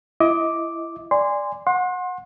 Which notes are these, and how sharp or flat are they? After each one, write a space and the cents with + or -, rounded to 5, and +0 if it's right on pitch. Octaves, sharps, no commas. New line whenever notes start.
E4 +25 D#5 +30 D6 +0
D5 +0 G#5 -25 C6 -15
F#5 -25 C6 +30